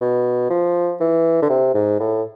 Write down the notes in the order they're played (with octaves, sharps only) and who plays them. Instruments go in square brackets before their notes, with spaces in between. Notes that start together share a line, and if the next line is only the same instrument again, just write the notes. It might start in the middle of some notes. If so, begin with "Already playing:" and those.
[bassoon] B2
F3
E3
D3
C3
G#2
A2